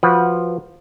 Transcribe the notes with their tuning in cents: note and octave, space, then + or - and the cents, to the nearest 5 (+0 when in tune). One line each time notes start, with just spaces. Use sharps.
F3 +0 F#4 +0 B4 -15